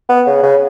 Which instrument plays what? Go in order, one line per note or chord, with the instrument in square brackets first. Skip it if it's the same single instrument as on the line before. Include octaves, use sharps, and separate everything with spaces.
[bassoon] B3
C#3
C#3